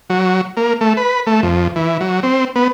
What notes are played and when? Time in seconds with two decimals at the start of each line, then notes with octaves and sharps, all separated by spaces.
0.10 F#3
0.57 A#3
0.81 A3
0.97 B4
1.27 A3
1.43 F2
1.76 E3
2.01 F#3
2.23 C4
2.56 B3